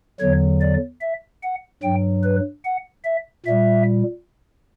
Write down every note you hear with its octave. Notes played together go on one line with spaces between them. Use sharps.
E2 D3 F#3 C#5
D5
E5
F#5
G2 F#3 G5
B4
F#5
E5
A#2 G3 E5